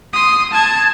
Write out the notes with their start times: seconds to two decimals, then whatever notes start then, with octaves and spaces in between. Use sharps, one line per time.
0.13 C6 D#6
0.51 A5 G#6